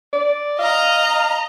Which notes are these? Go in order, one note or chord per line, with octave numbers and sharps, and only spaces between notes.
D5
D#5 F5 A#5